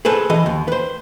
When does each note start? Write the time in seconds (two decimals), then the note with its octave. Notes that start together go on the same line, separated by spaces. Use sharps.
0.05 G#4 A4 B4 C5
0.30 E3 D#5
0.46 D#2
0.68 B4 C5